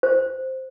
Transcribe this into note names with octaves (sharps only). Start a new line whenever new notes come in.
C5